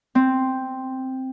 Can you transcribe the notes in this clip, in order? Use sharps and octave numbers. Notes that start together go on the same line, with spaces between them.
C4